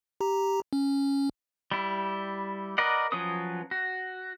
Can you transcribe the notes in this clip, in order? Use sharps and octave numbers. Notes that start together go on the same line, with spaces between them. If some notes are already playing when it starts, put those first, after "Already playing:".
G4 A#5
C#4
G3 E4
A#4 B4 D5 D#5 F#5
F3 F#3 C#4 B4 D#6
F#4